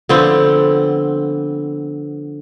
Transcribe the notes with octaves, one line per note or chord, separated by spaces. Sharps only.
D3 F3 B3 C4